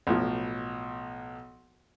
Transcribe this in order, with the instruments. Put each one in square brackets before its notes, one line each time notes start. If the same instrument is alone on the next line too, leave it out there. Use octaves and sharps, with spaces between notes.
[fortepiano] B1 A2 F3 F#4